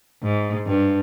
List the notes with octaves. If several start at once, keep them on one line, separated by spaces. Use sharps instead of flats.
G#2
G2